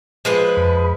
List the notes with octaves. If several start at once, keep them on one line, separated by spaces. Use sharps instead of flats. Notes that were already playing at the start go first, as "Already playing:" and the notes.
F3 G#3 B4
F2 B5